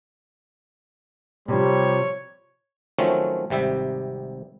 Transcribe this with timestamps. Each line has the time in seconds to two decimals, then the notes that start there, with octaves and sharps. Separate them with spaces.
1.48 C3 F3 G3 C#5
2.99 D#3 F3 F#3 A3 C4 C#4
3.50 G#1 C3 G3 E5